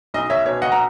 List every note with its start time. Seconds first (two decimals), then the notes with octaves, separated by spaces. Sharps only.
0.14 B1 D#5
0.30 C#5 E5
0.46 B2 C#5
0.62 D#5 F#5
0.72 A#5